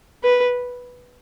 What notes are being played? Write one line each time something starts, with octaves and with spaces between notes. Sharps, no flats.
B4